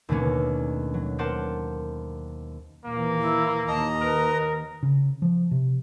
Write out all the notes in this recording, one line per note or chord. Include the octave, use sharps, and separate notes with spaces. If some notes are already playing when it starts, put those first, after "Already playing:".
D#2 B2 D3 A3 C#4
F#3
G4 A#4 C5 F#5 A5
D#2 A#2 E3 A#3
E4
D#2 D#3 D#5 A5 A#5
A#4 B4
C#3
F3
C3